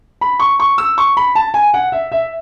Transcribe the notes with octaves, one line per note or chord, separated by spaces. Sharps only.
B5
C#6
C#6
E6
C#6
B5
A5
G#5
F#5
E5
E5